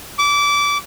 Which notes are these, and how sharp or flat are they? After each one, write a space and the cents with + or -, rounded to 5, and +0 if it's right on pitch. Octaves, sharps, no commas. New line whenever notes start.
D6 -25